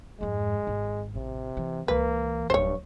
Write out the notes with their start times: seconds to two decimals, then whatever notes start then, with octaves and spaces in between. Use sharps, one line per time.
0.21 F2 G#2 G#3
0.67 G#1
1.15 A1 C3
1.57 E3
1.88 C#2 E3 A#3 B4
2.50 D1 G2 C5 C#5